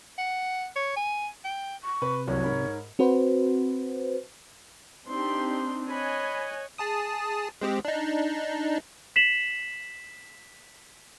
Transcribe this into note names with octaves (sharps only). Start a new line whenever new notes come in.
F#5
C#5
G#5
G5
C#6
C3 B4
F#1 C2 F#3 C#5
G#2 A#4 B5
C4 F#4 B4 C5
C4 D4 D#4 G4 C6
C#5 D#5 G#5 B5 F#6
G#4 A5 D#6
G#3 C4 G4
D4 D#4
B6 C7 E7 F#7